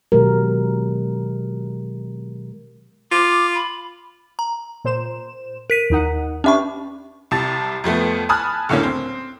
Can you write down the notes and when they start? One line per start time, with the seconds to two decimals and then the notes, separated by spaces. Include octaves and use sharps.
0.12 B2 D#3 F#3 G#3 G4 A#4
3.11 F4 D6
3.54 B5
4.39 A#5
4.84 A#2 C5 E7
5.70 A#4 B6 D#7
5.90 D#2 D#4 F#5
6.44 C#4 D4 G4 B4 E5 C#6
7.31 C2 C3 A5 A6
7.84 F2 F3 A3 B3
8.29 G#5 A5 B5 D#6 F6 F#6
8.69 C#2 A2 D3 A#3 C#4
8.83 C4